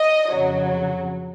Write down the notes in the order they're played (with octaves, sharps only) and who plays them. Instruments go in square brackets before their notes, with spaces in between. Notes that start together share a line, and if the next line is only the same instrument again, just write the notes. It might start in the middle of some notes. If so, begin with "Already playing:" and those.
Already playing: [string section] D#5
F2 C#3 F#3